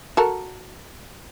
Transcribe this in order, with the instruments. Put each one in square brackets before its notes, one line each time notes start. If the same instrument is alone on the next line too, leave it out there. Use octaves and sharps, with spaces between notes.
[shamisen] F#4 A4 A#4